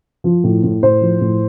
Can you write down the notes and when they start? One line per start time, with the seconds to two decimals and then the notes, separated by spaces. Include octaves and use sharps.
0.24 F3
0.44 A2
0.63 A2
0.83 A2 C5
1.01 F3
1.21 A2